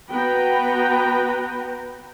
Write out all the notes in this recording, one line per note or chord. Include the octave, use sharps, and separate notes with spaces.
B3 F#4 B4 G5 A#5